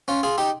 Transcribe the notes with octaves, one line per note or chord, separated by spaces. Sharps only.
C#4 F4
F4 G#4
D#4 G4